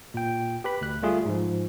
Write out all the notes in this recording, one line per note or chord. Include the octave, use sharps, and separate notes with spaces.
A#2 G5
G4 B4 B5
D2 F#6
G3 A3 F4 G#4
G#2 F3